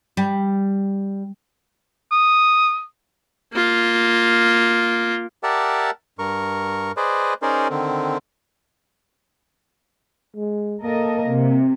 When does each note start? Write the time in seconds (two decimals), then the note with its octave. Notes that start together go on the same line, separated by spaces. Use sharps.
0.17 G3
2.12 D#6
3.53 A#3 F4
5.43 G4 A#4 D5 E5 F#5 A5
6.19 G2 A#4 C#6
6.97 G#4 B4 C5 D5 D#5
7.42 C#4 D#4 G#4 A#4 C5 D5
7.70 D3 D#3 C4
10.36 G#3
10.83 A#3 A4 A#4 D#5
11.28 C3